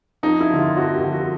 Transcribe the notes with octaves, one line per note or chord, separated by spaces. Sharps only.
F2 D#4
E4
D3 F3
F4
F2 F#4
G4
D3 F3
F#4